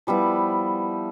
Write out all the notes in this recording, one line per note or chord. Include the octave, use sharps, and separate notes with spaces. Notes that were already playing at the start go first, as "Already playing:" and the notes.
F3 G3 B3 E4